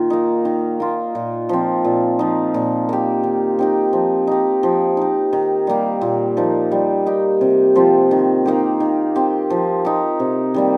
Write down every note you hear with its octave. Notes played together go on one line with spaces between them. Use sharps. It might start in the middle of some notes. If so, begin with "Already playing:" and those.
Already playing: A#2 D#3 F4
A#3 D#4
D#3
A#3 F4
A#2
F3 C4
A#2
F3 D#4
A#2
A#3 G4
D#3
C4 D#4 G4
F3
D#4 G4
F3
D#4 G4
D#3
G3 A#3 G4
A#2
F3 A#3 D#4
G3
D#4 G4
C3
F3 C4 F4
D#3
A#3 D#4 G4
D#3
C4 G4
F3
D#4 G4
C3
D#3 G3 A#3